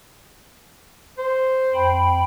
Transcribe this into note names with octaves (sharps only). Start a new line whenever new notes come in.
C5
F2 G5 B5